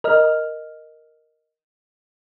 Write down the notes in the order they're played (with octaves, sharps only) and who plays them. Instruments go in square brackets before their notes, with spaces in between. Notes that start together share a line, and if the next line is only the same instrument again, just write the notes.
[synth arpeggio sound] A#4 D#5 F6